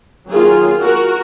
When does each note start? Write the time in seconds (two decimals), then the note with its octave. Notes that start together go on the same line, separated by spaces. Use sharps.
0.29 D#3 F#3 A#3 F4 G#4
0.81 F#4 A#4